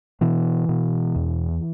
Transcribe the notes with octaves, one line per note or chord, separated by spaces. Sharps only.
B2 E3
B2
E2